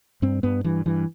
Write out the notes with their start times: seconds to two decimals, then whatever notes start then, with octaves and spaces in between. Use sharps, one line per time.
0.22 G2 C4
0.43 G2 B3
0.64 G2 E3
0.86 G2 E3